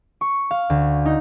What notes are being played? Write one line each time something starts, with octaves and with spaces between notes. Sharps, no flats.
C#6
F5
D2
D#4